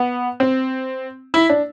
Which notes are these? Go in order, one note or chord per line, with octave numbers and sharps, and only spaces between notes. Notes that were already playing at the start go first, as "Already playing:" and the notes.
Already playing: B3
C4
E4
D4